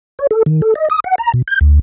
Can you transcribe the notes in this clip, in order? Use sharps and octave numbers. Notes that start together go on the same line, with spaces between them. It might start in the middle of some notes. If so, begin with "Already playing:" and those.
C#5
A4
D#3
A4
D#5
D#6
F#5
A#5
B2
G6
D2